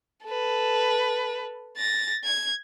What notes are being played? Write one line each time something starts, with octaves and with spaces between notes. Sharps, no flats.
A4 B4
A6 A#6
G#6